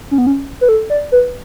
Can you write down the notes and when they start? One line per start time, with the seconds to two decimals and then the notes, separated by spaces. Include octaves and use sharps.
0.11 C#4
0.18 B3
0.27 C#4
0.61 B4
0.69 A4
0.90 D5
1.12 B4